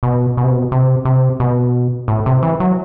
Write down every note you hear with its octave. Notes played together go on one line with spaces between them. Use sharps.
B2
B2
C3
B2
C3
C3
B2
A2
C3
E3
F#3